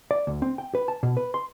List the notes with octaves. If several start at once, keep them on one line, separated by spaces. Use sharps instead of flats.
D5
D2
C4
G5
B4
A5
B2
B4
C6